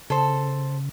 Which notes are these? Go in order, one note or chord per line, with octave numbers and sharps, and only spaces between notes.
C#3 A4 C5